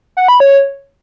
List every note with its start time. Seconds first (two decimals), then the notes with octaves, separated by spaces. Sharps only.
0.17 F#5
0.28 B5
0.40 C#5